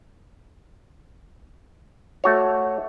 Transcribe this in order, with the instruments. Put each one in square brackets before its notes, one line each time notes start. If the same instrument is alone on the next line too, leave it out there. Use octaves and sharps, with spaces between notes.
[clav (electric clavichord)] A3 F#4 C#5